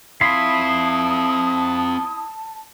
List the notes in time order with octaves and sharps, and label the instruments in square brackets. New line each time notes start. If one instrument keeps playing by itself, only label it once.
[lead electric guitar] C4 F5 [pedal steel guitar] E4 B5 C6 [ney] A5 [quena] D#6